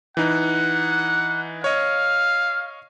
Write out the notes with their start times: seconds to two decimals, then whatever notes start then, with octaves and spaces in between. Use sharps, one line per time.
0.17 E3 D#4 F#5
1.64 C#5 D#5 F5